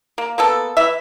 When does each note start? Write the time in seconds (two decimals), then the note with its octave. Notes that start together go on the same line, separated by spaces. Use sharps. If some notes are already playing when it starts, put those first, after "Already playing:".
0.18 A#3
0.38 A#3 B3 A4
0.77 E3 E5